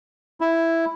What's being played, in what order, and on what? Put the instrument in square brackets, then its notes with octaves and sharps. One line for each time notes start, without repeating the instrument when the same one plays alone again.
[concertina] E4